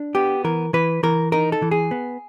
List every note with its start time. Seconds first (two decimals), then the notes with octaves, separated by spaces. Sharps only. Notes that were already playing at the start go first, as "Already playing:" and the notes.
Already playing: D4
0.15 B3 G4
0.44 E3 A#4
0.73 E3 B4
1.03 E3 A#4
1.32 D#4 A#4
1.52 A4
1.62 E3
1.71 G#4
1.91 B3